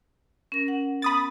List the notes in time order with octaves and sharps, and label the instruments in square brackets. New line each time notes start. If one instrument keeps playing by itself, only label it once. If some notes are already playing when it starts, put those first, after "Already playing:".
[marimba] C#4 A#4 A#6
F#5
[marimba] B3 [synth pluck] B5 D#6 A6